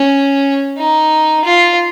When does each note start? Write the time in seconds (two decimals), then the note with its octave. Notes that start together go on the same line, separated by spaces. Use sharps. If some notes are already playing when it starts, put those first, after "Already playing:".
Already playing: C#4
0.77 D#4
1.45 F4